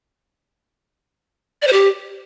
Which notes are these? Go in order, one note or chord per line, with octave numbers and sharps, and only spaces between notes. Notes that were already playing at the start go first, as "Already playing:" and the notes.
D5
C5
G4